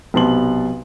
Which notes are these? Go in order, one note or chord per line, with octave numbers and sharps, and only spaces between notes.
B1 C3 B3 A5 C6 F#7